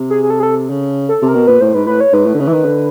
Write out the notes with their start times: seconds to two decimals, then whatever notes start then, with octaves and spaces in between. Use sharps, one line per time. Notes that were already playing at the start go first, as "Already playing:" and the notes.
Already playing: C3
0.10 G#4
0.23 G#4
0.30 A4
0.40 G#4
0.43 A4
0.70 C#3
1.09 A4
1.22 C3
1.28 A#4
1.35 B2
1.47 A#2 B4
1.61 A2 C5
1.74 G#2 B4
1.87 A2 B4
2.01 C#5
2.13 G#2 B4
2.26 A2
2.35 D3
2.40 C#3
2.48 E3
2.53 D#3
2.65 D3